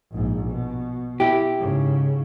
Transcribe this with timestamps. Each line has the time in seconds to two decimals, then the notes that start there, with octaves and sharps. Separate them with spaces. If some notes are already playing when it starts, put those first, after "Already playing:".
0.11 A#1 G#2
0.50 B2
1.20 E4 G4
1.60 G#2 C#3